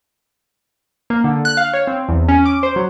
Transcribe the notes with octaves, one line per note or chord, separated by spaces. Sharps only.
A#3
D3
F#6
F5
C#5
C4
E2
C#4
D6
C5
F#3